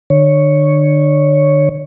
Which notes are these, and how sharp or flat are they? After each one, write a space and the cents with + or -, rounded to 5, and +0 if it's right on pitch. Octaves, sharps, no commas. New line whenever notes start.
D3 +35 C#5 +0